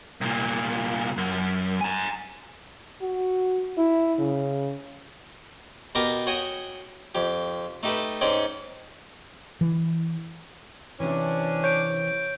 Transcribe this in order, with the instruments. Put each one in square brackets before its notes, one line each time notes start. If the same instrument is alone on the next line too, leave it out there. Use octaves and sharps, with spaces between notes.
[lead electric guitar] C2 A#2
F#2
G#5 A#5
[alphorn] F#4
E4
C#3
[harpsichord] B2 B3 G4 A#4 A#5 D6
F#4 C#5 G5 G#5 D#6
F2 G4
A3 D#4 G4 A4 B4
G#2 G#3 C#4 C#5 D5 G5
[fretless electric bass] E3
[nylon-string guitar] C3 E3 [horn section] C#4 D4
[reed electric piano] C#5 [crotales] G6 D7